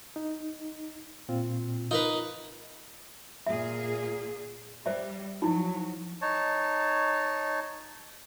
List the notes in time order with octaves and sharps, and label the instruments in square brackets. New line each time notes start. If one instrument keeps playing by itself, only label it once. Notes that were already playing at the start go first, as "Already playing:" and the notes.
[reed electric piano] D#4
A#2 C4 F4
[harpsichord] D#4 A#4 B4 [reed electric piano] F4
[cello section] A#2 G#4 [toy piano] E5
[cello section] G3 [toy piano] C5 D5 E5
[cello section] F3 F#3 [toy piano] D#4 E4
[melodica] D#4 C#5 A5